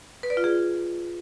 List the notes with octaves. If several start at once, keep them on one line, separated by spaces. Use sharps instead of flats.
B4
D5
F4
G#4